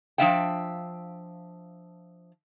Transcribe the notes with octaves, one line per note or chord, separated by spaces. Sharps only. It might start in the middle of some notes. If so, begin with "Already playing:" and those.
F3 G#3 D4 E5 F5 G5